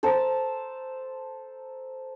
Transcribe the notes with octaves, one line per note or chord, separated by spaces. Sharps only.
A4 C5 A5 A#5